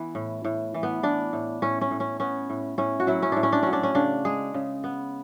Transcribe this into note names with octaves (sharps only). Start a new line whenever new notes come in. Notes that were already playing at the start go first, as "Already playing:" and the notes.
Already playing: E3 B3
A2
A2
E3
B3
E3 D4
A2
A2 C#4
C#4
A2
C#4
B3 C#4
A2
A2 C#4
F#4
F#3 E4
C#4
A2 D4
C#4
D4
F#3 C#4
D4
C#4
C#3 D4
G#3 G#4
C#3
B3